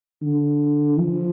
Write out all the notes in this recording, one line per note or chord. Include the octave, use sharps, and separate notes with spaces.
D3
F3